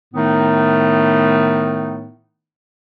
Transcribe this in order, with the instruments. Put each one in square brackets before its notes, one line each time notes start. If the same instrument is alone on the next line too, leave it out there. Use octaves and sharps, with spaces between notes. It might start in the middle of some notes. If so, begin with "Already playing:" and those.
[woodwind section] A2 D#3 A3 B3 D#4